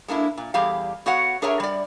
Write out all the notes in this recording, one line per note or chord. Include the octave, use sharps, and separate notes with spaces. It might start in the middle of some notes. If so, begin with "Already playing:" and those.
G#3 A#3 D4 E4
A#2
E2 G3 G4 G#4 F5
B3 F#4 C#5 F5 F#5
D4 G#4 A#4 C#5 E5 A#5
G3 D5